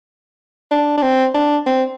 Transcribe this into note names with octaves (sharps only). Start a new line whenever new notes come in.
D4
D4
C4
D4
C4